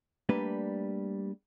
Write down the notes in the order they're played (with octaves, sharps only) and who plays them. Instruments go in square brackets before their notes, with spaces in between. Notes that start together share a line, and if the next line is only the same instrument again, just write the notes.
[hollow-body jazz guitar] G3 A3 A#3 D4 B4